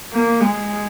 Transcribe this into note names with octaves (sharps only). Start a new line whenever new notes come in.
A#3
G#3